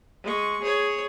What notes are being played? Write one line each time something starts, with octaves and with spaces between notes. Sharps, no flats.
G#3 C#6
G#4 C#5